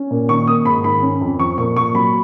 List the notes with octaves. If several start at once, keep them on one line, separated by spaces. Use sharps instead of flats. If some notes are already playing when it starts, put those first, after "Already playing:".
Already playing: C#4
A#2
D#3 C#6
A#3 D#6
G#2 B5
D#3 B5
C#4
F2
F3 C#6
A#2 C#6
A#2 C#6
F#3 B5